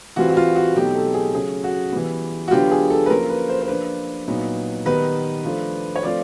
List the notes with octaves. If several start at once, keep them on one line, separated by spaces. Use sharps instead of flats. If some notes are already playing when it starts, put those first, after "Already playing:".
E3 G3 C4 F4 F#4
F#4
F4
F#4
B2 F#3 A3 C4 D#4 G4
A4
G#4
C#3 F#3 A3 C#4 G#4
F#4
E3 G3 B3
F#4
D3 F#3 B3 D4 F4 G4
G#4
A4
B4
F3 A#3 C#4 F4 A#4
B4
C5
C5
F3 A#3 D4 B4
A#2 F#3 B3 D#4
D#3 G3 B3 D#4 B4
F3 A3 D4 F4
C#5
F3 A3 C4 F4 D5